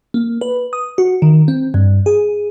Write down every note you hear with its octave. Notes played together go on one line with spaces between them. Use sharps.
A#3
B4
D#6
F#4
D#3
C4
G2
G#4